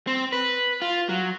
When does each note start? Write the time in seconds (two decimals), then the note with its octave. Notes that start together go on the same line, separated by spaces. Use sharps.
0.07 C4
0.32 B4
0.82 F4
1.09 F#3